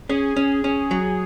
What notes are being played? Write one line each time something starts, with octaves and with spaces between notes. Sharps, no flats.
C#4 G#4
C#4
C#4
F#3